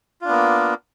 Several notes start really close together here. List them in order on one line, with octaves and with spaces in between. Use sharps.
F4 D4 B3 A#3